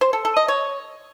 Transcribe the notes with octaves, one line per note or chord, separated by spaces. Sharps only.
C5
A4
A4
D#5
C#5